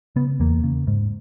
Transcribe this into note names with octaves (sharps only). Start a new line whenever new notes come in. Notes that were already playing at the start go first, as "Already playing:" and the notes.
C#3 B3
E2 A#3
C#3
G#2